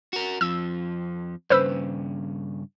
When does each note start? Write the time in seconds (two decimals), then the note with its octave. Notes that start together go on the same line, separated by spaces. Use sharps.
0.13 F#4 A#4
0.41 F2 F3 E6
1.50 G2 C#3 B4 C5 E6